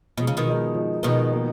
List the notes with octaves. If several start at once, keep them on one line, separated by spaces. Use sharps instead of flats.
B2 F3 G#3 D#4
C#3
B2 D#3
F3 G#3 D#4
F3 G#3 D#4
B2 D#3 F3 G#3 D#4
F3 A#3 D#4